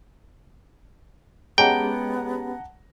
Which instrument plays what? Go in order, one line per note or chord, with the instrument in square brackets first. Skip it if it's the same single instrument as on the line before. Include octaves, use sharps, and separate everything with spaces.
[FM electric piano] G#3 C#4 G4 [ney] B3 [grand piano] F#5 A5 A#5 [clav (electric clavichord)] G5